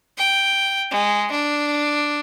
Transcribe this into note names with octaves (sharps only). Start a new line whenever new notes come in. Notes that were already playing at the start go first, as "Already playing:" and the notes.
G5
G#3
D4